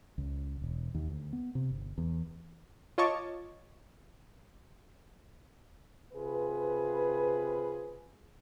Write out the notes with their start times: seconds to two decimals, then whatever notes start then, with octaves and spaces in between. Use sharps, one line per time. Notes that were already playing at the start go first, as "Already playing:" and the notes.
0.18 C#2
0.62 E1
0.94 D#2
1.09 D2
1.33 B3
1.55 C3
1.70 G1
1.98 E2
2.98 F4 C#5 D#5 A5 C#6 D6
6.14 C3 F4 G#4 B4